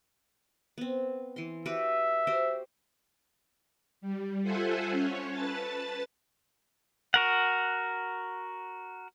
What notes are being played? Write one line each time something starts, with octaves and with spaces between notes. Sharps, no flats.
B3 C4
E3 C6
F#4 G4 B4 E5
F#4 G4 C5
G3
F4 A4 C5 E5 F#5 G#5
C#4 C#5
B4 A5 A6
F#4 A#4 F#5